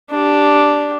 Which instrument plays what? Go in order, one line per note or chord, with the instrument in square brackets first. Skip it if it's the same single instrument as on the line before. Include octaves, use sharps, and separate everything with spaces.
[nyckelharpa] D4 G4